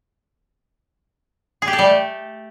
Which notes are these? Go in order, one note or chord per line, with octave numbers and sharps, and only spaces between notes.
G#4
G4
A4
G3
A3